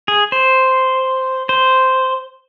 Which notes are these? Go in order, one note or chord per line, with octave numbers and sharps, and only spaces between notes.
G#4
C5
C5